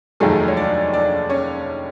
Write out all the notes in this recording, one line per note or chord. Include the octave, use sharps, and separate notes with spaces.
F1 D#2 D#3 F#3 G#3 A3 G#4
C#5
D4 D5
D4 D5
C#4 C#5